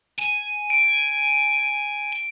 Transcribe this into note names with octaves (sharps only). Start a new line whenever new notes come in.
G#5
D7